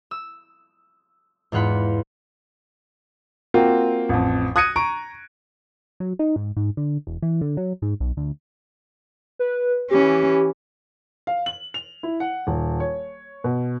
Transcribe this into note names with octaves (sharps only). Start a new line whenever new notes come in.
E6
E2 G#2 F4 F#5 B5
A#3 C4 F4 F#4 A#4
A1 F2
D#6 F#6 G#6 A#6 C#7 D#7
A#5 C#6 D7
F#3
D#4
G#2
G#2
D3
E1
E3
D3
F#3
G#2
B1
D2
B4
E3 C#4 G4
F5
F#7
F7
E4
F#5
D#1
C#5
B2